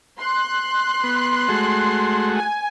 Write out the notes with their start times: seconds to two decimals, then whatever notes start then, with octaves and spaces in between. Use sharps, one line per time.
0.19 C6 F#6
1.04 B3
1.49 G#3 A3 F#4
2.36 G#5